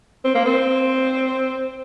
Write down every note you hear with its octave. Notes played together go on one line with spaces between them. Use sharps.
C4
A#3
C4